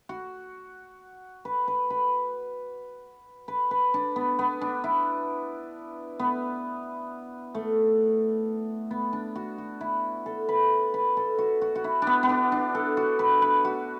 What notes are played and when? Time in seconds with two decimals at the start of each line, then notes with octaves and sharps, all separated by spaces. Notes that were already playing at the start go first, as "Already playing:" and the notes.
0.09 F#4
1.45 B4
1.68 B4
1.90 B4
3.48 B4
3.71 B4
3.94 D4
4.16 B3
4.39 B3
4.61 D4
4.84 E4
6.19 B3
7.55 A3
8.91 B3
9.13 D4
9.36 F#4
9.58 F#4
9.81 E4
10.26 A4
10.49 B4
10.94 B4
11.17 A4
11.39 F#4
11.62 F#4
11.75 F#4
11.84 E4
12.02 B3 D4
12.23 B3
12.29 D4
12.52 D4
12.75 A4
12.97 F#4
13.19 B4
13.42 B4
13.65 F#4